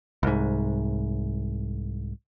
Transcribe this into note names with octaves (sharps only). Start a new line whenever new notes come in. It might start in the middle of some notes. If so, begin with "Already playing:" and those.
C2 G#2